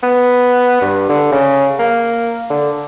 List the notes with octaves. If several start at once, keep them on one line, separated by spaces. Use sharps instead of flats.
B3
G2
D3
C#3
A#3
D3